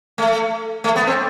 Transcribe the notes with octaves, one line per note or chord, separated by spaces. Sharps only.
A3
A3
B3
C4